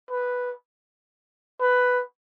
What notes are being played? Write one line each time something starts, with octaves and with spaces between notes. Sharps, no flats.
B4
B4